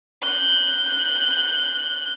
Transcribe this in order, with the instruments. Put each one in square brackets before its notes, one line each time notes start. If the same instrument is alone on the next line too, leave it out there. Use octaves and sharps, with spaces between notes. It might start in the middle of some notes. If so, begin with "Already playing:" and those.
[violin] F#6 G6